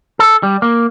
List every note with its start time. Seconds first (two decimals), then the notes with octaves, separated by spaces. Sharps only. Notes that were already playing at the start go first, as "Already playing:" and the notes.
0.19 A4
0.43 G3
0.62 A#3